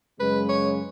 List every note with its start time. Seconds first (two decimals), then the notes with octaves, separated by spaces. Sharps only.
0.20 F#2 C#3 G#3 B4
0.49 C#5